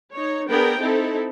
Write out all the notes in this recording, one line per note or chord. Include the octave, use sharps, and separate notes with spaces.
D#4 C#5
B3 D4 G#4 A#4 G5
C4 D#4 E4 A4